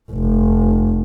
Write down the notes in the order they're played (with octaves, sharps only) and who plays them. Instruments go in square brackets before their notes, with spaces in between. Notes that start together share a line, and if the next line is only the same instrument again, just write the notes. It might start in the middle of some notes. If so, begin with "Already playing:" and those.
[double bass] F1